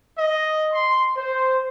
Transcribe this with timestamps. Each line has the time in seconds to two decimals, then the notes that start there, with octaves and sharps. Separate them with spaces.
0.18 D#5
0.73 C6
1.16 C5